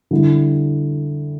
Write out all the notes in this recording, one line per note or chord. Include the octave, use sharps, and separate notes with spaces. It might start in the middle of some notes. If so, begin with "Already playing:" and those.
D3 G3 E4